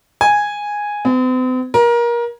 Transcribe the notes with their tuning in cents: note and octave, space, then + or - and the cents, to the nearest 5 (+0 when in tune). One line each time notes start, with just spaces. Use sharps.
G#5 -5
C4 -45
A#4 +25